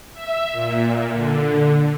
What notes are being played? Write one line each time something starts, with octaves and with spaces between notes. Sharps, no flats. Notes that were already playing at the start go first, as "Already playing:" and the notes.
E5
A#2
D3